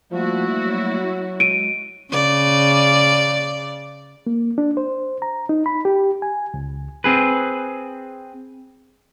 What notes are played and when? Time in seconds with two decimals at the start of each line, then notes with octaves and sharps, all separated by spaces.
0.12 F3 G3 A3 A#3 E4 F#4
0.64 F#3
1.40 G#3 D7 D#7
2.11 C#3 D5
4.27 A#3
4.58 D4
4.77 C5
5.22 A#5
5.49 D#4
5.66 B5
5.85 G4
6.22 G#5
6.54 C#2
7.04 C4 G#4 B4